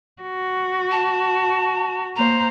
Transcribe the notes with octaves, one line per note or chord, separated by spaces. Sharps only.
F#4
A5
A#3 C5 A#5